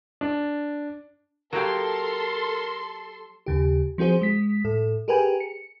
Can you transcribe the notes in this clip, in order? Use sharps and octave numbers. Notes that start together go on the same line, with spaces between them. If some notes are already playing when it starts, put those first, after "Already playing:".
D4
F#3 A#3 G4 A4 A#4 C6
D#2 C#3 G4
F3 C4 F#4 G#4 C5
G#3 B6
A2 A4
G4 G#4 A#4 B4 G5 G#5
C#7